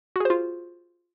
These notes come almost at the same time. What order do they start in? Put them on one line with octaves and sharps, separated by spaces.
F#4 G#4 C5 F4